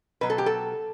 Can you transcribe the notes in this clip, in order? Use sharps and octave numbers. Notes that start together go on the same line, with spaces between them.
B2 F#3 B4
A4
G4
A4